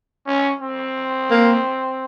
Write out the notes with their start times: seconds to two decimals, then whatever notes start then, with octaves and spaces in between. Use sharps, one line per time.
0.27 C#4
0.62 C4
1.31 A#3